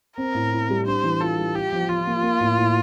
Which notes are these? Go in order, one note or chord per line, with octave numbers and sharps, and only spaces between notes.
C4 A#4
A2
E4
G3
D4 C5
E3
F4 A4
G3
F4 G4
F3
F3 F4
A#3
A#3
A2
A2